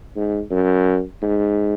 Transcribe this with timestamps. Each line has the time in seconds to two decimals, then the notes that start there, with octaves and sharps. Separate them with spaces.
0.16 G#2
0.51 F#2
1.22 G#2